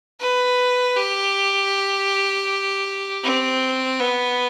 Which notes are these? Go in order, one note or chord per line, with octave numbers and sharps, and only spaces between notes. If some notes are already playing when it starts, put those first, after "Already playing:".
B4
G4
C4
B3